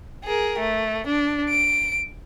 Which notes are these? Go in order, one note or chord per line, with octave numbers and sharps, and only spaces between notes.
G#4 A#4
A3
D4
D7